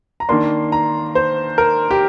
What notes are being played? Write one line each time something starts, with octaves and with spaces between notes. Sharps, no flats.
A#5
D#3 A#3 D4 C6
A#5
C5
A#4
G4